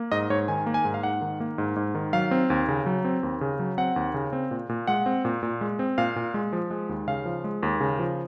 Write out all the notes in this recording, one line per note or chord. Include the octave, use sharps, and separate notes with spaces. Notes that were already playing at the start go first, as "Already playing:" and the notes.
Already playing: A#3
G#2 D#5
G#2 C#5
D#3 G#5
A#3
G#5
G#2
F5
G#2 F#5
D#3
A#3
G#2
G#2
D#3
F#3 F5
C4
D#2
C#3
F#3
C4
D#2
C#3
F#3
C4 F#5
D#2
C#3
C4
A#2
A#2
G#3 F#5
C4
A#2
A#2
G#3
C4
A#2 F5
A#2
G#3
F3
G#3
D#2
C#3 F5
F3
G#3
D#2
C#3
F3